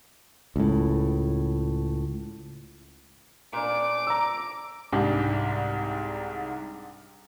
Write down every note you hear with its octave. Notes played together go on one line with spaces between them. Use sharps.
C#2 A2
A#2 D4 D6
A#5 E6
C2 G#2 D4 G4 G#4 G5